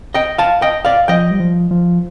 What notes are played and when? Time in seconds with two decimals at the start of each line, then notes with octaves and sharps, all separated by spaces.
0.14 D#5 G5
0.38 F5 A5
0.62 D#5 G5
0.85 D5 F5
1.08 F3 D#5 G5
1.31 G3
1.40 F3
1.71 F3